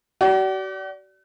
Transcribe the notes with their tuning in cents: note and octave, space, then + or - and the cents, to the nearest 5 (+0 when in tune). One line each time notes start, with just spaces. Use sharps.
F#4 +45 D5 -20